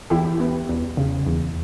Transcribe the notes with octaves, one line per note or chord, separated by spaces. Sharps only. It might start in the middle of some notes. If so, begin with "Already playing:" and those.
E2 E4 G4
B3
E2
C#3
E2